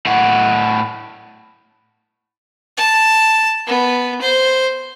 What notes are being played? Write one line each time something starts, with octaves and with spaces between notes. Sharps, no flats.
A2 F#5
A5
B3
C5